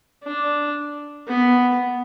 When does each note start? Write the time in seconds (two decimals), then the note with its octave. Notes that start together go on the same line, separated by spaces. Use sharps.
0.23 D4
1.28 B3